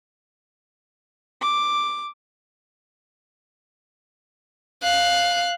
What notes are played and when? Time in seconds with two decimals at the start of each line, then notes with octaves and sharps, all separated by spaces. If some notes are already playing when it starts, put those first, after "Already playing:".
1.41 D6
4.83 F5 F#6